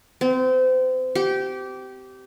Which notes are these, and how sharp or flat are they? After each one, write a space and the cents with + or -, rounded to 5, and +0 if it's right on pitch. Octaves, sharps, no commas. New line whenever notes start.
C4 -30
G4 -20